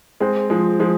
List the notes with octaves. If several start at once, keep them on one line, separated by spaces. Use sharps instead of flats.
G#3 C4
F3 G#3
F3 G#3